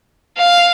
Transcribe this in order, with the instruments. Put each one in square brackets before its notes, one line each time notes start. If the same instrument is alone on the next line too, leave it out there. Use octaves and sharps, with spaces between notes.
[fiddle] F5